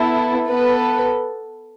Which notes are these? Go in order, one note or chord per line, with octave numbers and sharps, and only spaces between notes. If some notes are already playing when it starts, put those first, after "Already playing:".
Already playing: B3 E4 A4
B3 A4 B4